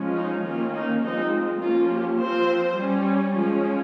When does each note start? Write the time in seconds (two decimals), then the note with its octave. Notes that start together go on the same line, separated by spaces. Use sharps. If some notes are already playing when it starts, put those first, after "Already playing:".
Already playing: F3 G#3 C#4
0.17 D#4
0.45 D#3 A#3 C#4 F4
0.75 D#4
1.03 F3 G#3 C4 D#4
1.61 F3 A#3 C#4 F4
1.91 G4
2.20 F3 C4 C5
2.77 G3 C#4
3.36 F3 G#3 C#4